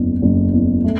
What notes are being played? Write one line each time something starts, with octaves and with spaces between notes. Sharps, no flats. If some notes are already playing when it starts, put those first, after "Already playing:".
Already playing: F#1 E2
F#1
E2
A3